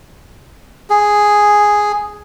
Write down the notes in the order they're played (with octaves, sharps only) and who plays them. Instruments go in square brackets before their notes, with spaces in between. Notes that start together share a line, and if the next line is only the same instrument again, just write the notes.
[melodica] G#4